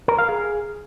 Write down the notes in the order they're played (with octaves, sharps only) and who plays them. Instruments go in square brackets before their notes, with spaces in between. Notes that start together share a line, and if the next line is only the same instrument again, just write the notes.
[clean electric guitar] A#4
F5
G#4